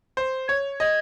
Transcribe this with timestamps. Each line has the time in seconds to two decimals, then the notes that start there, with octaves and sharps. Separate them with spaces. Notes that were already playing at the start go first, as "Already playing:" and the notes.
0.17 C5
0.48 C#5 G#6
0.80 D#5 G#6